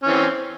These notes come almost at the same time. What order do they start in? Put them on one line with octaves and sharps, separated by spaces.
C#4 E3 C4